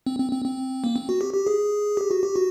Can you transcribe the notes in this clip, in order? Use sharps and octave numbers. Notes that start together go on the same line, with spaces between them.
C4
C4
C4
C4
A#3
C4
F#4
G4
G4
G#4
G4
F#4
G4
F#4